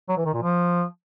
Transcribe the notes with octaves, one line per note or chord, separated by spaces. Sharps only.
F#3
E3
D#3
A#2
F3